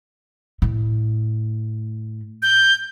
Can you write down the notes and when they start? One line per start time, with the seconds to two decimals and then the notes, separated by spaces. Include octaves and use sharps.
0.62 A2
2.42 G6